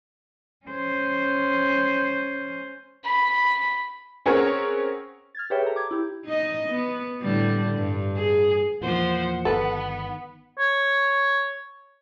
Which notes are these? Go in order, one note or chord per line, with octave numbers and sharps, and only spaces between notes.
C#4 C5
B5
C4 C#4 G#4 A#4 C#5 F#5
F6 G#6 A6
G4 G#4 B4 C#5 E5 G5
A4 A#5
D6 G#6
E4 G4
D#4 D#5
B3
A2 D3 G3
G2
G#4
E2 A#2 F3 C5 F#5
G1 D#3 B3 A4 B4
C#5